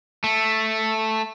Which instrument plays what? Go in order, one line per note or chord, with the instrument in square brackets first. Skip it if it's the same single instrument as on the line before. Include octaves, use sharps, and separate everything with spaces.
[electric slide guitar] A3